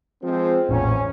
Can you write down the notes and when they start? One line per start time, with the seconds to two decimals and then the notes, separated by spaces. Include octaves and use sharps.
0.22 F3 G#3 C4
0.69 A1 E2 A#2 C#4